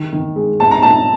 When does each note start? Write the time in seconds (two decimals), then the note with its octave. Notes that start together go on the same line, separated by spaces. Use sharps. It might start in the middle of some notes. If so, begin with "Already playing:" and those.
Already playing: D#3
0.12 D#3
0.36 G#3
0.60 A#2 A5
0.71 A#5
0.83 A#2 A5